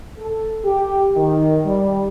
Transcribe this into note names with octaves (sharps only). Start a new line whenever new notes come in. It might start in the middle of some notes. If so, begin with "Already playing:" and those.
A4
G4
D#3
G3